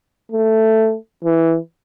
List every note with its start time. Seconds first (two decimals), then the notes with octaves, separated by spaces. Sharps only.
0.32 A3
1.24 E3